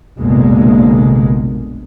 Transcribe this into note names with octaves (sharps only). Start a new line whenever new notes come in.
F1 A#1 B2 D3 G#3 A#3